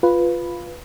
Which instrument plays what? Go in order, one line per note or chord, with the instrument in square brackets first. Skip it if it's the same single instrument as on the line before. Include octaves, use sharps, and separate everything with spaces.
[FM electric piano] F4 B4